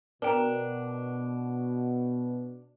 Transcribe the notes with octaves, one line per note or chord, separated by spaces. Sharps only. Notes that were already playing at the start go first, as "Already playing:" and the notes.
B2 D4 A#4 G5 A#5